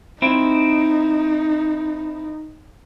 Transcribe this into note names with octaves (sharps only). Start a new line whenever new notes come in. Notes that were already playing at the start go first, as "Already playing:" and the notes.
C4 D#4 E4